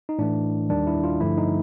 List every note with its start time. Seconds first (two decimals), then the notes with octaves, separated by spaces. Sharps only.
0.09 D#4
0.19 A2 E3 A3 D4
0.69 D#2 D#3 G3 D4
0.87 E4
1.04 F4
1.21 G2 D3 F3 A3 E4
1.37 D#4